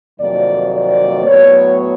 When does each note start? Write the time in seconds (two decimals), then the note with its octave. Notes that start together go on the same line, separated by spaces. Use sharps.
0.20 F2 C3 D#3 F#3 A#3 D5
0.72 D5
1.26 A2 F#3 B3 C#5